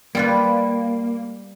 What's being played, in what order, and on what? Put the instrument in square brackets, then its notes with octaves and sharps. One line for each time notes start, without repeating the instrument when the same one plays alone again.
[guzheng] G3 F4 B4 [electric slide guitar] A#3